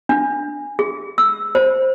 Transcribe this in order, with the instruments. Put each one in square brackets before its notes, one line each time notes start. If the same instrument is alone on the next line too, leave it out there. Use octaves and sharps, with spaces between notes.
[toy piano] D4
G#4
E6
C5